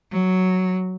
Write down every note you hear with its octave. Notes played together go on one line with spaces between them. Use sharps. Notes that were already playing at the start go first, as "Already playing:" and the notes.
F#3